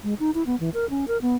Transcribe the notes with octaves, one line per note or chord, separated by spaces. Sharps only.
G#3
D#4
E4
B3
E3
A#4
C#4
A#4
B3